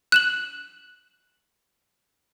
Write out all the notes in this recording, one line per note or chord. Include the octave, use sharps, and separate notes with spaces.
F#6 E7 F#7